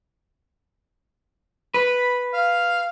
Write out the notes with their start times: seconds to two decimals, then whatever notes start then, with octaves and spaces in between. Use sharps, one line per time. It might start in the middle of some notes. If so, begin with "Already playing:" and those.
1.74 B4 B5
2.34 F5